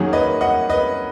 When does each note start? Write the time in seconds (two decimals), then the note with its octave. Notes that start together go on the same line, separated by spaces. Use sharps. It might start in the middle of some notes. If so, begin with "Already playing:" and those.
Already playing: F#2 D#3 F#3 A#3 C#4 G#4
0.13 B4 D#5
0.41 D#5 F#5
0.69 B4 D#5